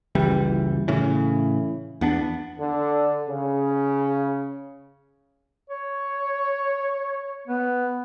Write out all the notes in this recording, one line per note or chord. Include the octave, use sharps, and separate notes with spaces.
F#1 C#2 E3 G3
A2 C#3 E3
E2 B3 D4
D3
C#3
C#5
B3